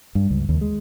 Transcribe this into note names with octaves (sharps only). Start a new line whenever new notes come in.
G2
C#2
D#2
G#3